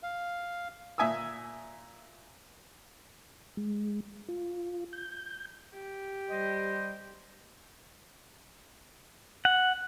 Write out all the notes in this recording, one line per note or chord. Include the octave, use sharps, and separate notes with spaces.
F5
A#2 E5 G#5 D#6 E6
G#3
F4
G6
G4
G3 C5 D#5
F#5